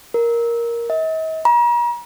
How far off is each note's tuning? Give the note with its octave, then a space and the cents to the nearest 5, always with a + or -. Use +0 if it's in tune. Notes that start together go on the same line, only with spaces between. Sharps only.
A#4 +5
D#5 +45
A#5 +40